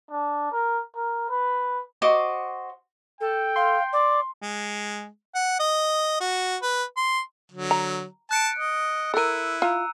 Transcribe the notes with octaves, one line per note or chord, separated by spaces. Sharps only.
D4
A#4
A#4
B4
F#4 C5 D#5 D6
A4 G5
F5 C6
D5 D6
G#3
F#5
D#5
F#4
B4
C6
D3 F#3
A#5
A5 F#6 C#7 D7
D#5
E4 A4 A#4 E6 F#6 D#7
F4 A#5 E6